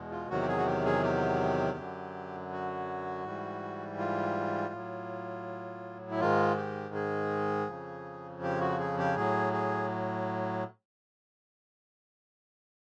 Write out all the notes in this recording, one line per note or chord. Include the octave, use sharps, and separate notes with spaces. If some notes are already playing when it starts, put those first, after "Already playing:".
Already playing: E2 B2 G#3
F4
E2 C3 D#3 F#3 F#4
G4
G#4
F#4
G4
G#4
G4
F#2 D3 F#3
F#4
G#2 E3 G3
F4
A2 F#3
E4
G#2 D#3 G#3 F4
G4
G#4
F2 C#3 F3
G4
F#4
G#4
G4
A2 F#3 G#4
G#4